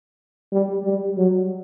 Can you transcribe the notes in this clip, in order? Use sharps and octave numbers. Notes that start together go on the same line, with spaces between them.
G3
G3
F#3